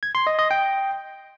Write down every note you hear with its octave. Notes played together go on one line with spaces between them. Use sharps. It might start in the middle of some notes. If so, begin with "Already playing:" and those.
G#6
C6
D#5
D#5
G5